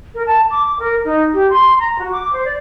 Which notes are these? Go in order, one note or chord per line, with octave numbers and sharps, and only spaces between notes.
A#4
A5
D6
A#4
D#4
G4
C6
A#5
F#4
D6
C5
D5